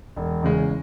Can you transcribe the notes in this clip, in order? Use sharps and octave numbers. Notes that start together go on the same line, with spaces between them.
E1
E2 C#3 G#3